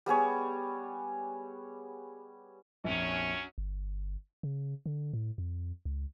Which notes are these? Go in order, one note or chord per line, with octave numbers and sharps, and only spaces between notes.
G3 B3 G#4 C#5
A#1 F2 F#3 C#4
G1
C#3
D3
A2
F2
C#2